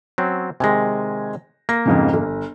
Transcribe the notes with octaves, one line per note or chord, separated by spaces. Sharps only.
F#3 C4 C#4
C3 D#3 G#3 G#5 A#6
A#3 A#6
F2 G#2 C#3
G1